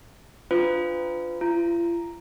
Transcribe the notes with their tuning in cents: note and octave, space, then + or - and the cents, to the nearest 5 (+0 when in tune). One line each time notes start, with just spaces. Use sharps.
D4 +0 F4 +0 B4 +40
F4 -45 A#5 +0